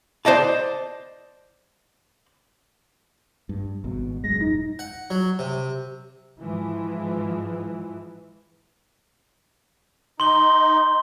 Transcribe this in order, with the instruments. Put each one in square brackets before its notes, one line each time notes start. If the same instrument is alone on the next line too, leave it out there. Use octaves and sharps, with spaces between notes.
[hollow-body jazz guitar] C5 D5 D#5 A5
[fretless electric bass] G2
G#1 B2
[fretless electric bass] D#1 F#2 G#3 [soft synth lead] A#6
[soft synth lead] D#4
[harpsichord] F#5
F#3
C3
[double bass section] G#2 E3 F3
[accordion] D#4 [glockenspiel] C6 G7